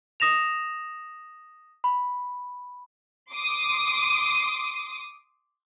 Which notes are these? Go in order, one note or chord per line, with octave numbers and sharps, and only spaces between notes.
D#6 A#6 E7 F7
B5
C6 D6 D#6